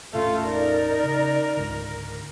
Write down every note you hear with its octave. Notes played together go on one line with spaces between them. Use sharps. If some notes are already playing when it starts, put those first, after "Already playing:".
E1 A2 A3 C#4 F4
D#4 A#4 D5
C#3
C#2 G#2 D3